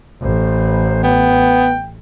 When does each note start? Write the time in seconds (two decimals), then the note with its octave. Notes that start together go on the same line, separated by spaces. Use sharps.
0.22 A1 C5
1.03 B3 G5